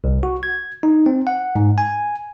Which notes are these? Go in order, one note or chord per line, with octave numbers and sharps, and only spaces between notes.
C2
F#4
G#6
D#4
C4
F#5
G#2
G#5